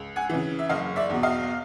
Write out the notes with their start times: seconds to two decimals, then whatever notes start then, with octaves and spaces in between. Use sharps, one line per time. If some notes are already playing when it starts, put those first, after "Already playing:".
Already playing: C#2
0.16 F#5 G#5
0.29 C#3 E3
0.59 E5
0.69 F#1 D#5 F5
0.96 D5 E5
1.10 E2 B2
1.23 D#5 F5